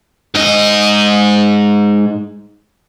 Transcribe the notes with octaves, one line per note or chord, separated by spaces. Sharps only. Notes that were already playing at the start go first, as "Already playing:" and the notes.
G#2 D#5